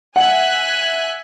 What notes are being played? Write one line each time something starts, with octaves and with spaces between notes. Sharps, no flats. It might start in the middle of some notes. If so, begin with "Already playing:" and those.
E5 F#5 G#5 F#6